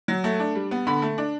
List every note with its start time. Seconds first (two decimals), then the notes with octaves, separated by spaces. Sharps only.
0.08 F#3
0.24 A3
0.40 D4
0.55 G3
0.71 B3
0.87 D3 B5
1.02 A3
1.18 D4